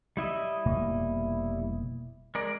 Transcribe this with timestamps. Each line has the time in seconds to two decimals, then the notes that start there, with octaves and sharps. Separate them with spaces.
0.17 G3 E4 D#5
0.66 F1 B2 A#3
2.35 G#3 A#4 D5